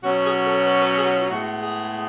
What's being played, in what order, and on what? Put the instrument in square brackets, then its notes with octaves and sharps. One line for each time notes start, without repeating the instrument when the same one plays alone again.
[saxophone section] B2 F#3 C#4 F#4
G#4
A4
B4
B4
G#4
F4
A2 G#3 B3 F#4
G#4